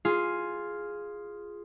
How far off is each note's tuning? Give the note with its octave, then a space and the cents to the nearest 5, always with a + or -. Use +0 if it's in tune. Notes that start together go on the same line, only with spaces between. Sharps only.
F4 +0 G#4 +0